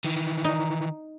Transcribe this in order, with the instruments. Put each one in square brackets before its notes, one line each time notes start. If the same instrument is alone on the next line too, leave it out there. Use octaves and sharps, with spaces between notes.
[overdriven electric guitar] D#3 E3
[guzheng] D#4